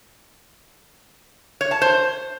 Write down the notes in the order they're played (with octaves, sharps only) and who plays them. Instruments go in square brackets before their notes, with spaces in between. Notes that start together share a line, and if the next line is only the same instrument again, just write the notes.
[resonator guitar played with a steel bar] C#5
A5
C5